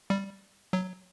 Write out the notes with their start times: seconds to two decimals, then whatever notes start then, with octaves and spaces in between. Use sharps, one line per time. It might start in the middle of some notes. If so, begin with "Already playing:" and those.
0.10 G3
0.73 F#3